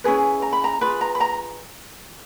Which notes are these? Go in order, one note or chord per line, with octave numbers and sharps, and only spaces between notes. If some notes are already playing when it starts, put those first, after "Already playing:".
C#4 E4 G#4 B4
A#5
B5
A#5
F4 G#4 B4 B5
A#5
B5
A#5